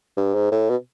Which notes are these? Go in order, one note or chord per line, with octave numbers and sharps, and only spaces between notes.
G2
G#2
A2
B2